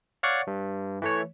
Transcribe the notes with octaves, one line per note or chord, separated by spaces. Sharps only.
C#5 D5 F5 F#5 C#6
G2
E3 A3 C#5